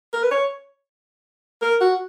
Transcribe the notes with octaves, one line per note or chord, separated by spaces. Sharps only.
A#4
B4
C#5
A#4
F#4